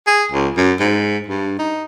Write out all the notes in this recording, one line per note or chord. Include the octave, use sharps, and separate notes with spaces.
G#4
C#2
F#2
G#2
G2
D#4